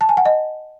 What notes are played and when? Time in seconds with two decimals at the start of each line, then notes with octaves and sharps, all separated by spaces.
0.01 A5
0.09 G#5
0.17 F#5
0.25 D#5